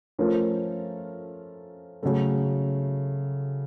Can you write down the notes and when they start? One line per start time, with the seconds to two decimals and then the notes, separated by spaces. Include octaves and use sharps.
0.19 F3 A3 C#4 F4 A#4
2.03 C#3 F#3 A3